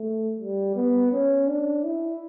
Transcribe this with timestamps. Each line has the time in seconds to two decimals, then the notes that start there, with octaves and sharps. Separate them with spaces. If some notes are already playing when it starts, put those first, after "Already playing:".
Already playing: A3
0.40 G3
0.76 B3
1.13 C#4
1.48 D4
1.84 E4